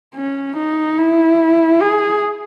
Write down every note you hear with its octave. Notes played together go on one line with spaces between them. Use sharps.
C#4
D#4
E4
G#4